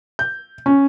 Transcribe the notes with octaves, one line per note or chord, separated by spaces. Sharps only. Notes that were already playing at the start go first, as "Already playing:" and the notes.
G6
C#4